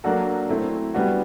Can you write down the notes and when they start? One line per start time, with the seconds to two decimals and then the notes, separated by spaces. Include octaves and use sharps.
0.04 F#3 A#3 D4 F#4 A4
0.49 F#3 A3 C4 E4
0.94 G3 B3 D4 F#4